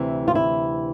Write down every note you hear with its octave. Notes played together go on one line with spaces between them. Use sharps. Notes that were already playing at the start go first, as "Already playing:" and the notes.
Already playing: D2 C3 E3
F4
E4